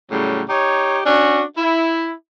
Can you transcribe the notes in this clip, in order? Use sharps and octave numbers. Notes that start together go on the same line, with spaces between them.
A2 C#3 F#3 G3
D#4 G4 C#5
C#4 D4 F#4
E4